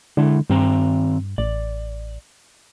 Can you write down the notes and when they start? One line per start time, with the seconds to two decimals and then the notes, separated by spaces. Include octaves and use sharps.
0.17 D3 G#3 E4
0.50 G2 D#3 C4 A#5
1.38 A1 D5